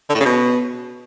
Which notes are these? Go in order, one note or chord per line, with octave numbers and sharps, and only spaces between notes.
D3
A2
C#3
B2